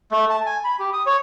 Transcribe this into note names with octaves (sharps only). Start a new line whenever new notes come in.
A3
A5
G#5
B5
G4
D#6
C#5